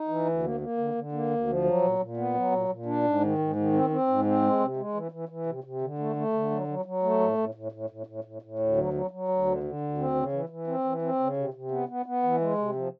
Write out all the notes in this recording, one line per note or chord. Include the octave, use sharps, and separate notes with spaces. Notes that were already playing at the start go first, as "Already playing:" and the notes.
Already playing: D#4
E3
D2
A#3
A#3
D3
D3
A#3
D2
F3
F#3
A#2
A#2
B3
F#3
A#2
A#2
D4
G#2
D#3
G#2
D#3
C4
C4
G#2
C4
G#3
C3
G#3
E3
E3
E3
C3
C3
D3
A3
A3
D3
F#3
F#3
F#3
A3
A2
A2
A2
A2
A2
A2
A2
A2
D2
F#3
F#3
F#3
D2
D3
D3
D2
C4
C#3
E3
E3
C4
E3
C4
C#3
C3
C3
B3
B3
B3
E3
G#3
C3
F3